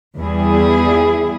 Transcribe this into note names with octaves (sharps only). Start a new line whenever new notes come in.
E2 G3 B3 E4 G#4